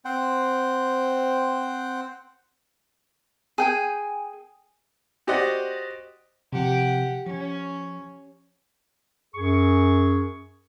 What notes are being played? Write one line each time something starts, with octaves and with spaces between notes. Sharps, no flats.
C4 C5 F#5 G5
G#4 G5 G#5
F#4 G4 C5 D5 D#5 F#5
C3 F3 G4 F#5
F3 C#4
F#2 G#4 C#6